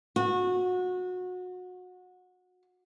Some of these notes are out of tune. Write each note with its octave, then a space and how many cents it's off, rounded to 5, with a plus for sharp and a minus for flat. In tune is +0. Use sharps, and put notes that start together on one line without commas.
F#4 -25